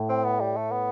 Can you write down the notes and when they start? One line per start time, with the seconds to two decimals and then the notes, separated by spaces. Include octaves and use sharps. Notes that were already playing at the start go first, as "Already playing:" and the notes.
Already playing: A2
0.09 C4
0.25 B3
0.40 G3
0.56 A3
0.72 B3